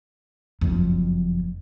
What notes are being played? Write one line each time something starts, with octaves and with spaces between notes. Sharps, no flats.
F#1 F2